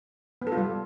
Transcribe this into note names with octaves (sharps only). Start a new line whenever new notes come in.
B3
A4
F4
G3